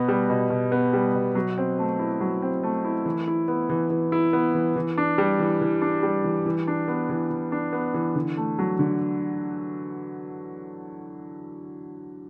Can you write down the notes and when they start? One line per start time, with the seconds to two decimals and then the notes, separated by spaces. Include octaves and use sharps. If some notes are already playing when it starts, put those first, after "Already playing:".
Already playing: B2 B3
0.08 G3
0.30 B2
0.50 B2
0.72 B3
0.93 G3
1.15 B2
1.35 F#3
1.58 C4
1.79 A3
1.99 E4
2.21 F#3
2.42 C4
2.63 A3
2.85 E4
3.06 E3
3.28 E4
3.48 B3
3.70 E3
3.90 E3
4.12 E4
4.33 B3
4.54 E3
4.76 E3
4.98 D4
5.18 G3
5.39 E3
5.61 E3
5.82 D4
6.03 G3
6.24 E3
6.46 E3
6.68 D4
6.88 B3
7.09 E3
7.30 E3
7.52 D4
7.73 B3
7.94 E3
8.15 D3
8.37 A3
8.59 F#3
8.79 D3